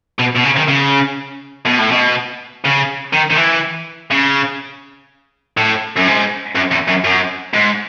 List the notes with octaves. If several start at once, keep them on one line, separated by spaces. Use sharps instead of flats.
B2
B2
C#3
D#3
C#3
B2
A2
B2
C#3
D#3
D#3
E3
C#3
A2
F#2
G#2
F#2
E2
F#2
F#2
G#2